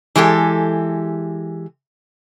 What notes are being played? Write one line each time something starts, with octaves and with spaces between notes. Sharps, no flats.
E3 G#3 G4 A4